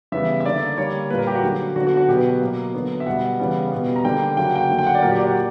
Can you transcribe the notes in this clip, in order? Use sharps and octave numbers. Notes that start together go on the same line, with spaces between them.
C#3 E3 G3 B3 E5
E5
D3 A#3 D5
D3 G3 A#3 C#5
A#2 G3 A#3 B4
A#4
G4
F#4
D3 F#3 A#3
D3 F#3 B3 F#4
F#4
F#4
B2 F#3 B3 G4
B4
B2 F#3 A#3
D3 F#3 B3
E5
B2 G3 B3 F#5
C#3 E3 G3 B3
B2 G3 B3
A#5
D3 G3 A#3 G5
C#3 F#3 A#3 G5
F#5
G5
D3 F#3 A#3
G5
F#5
D5
A#2 F#3 A#3 A#4
G4
D5
F#5